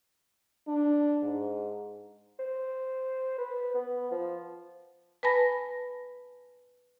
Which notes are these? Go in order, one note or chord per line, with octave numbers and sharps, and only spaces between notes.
D4
G#2
C5
B4
B3
F3
B4 G#5 A5 B5 A#6